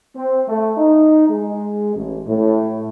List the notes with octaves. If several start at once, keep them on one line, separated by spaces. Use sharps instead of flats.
C4
A3
D#4
G#3
A1
A2